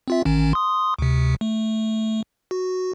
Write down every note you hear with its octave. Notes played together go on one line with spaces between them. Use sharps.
C4 F4 E5
A1 D#3 C#4
C6 D#6
D2 C3
A3
F#4